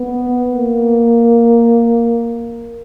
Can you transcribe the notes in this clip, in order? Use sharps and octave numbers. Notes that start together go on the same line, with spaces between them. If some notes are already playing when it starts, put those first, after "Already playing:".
Already playing: B3
A#3